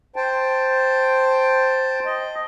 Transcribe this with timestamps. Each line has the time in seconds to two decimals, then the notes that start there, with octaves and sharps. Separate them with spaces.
0.16 C5 G5 A5
2.05 D#5